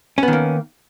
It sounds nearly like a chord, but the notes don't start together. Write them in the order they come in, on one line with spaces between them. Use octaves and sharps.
C#4 B3 D#3 A#3